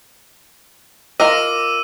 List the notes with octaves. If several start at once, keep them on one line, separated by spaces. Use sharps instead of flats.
F4 A#4 D#5 D6 E6 D#7